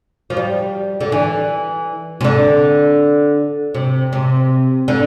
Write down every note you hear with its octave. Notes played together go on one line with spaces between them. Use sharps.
F3
G3
D3
E3
C3
D3
C3
C3
D3